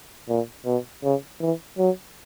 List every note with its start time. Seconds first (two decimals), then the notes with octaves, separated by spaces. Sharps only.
0.29 A#2
0.66 B2
1.03 C#3
1.41 E3
1.78 F#3